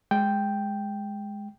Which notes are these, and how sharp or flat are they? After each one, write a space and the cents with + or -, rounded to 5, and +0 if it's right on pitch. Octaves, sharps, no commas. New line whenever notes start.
G#3 +0 G5 +0